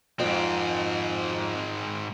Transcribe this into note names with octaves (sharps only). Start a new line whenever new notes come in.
F2 G#2 C4